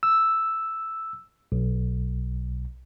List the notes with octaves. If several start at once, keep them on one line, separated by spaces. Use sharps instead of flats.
E6
B1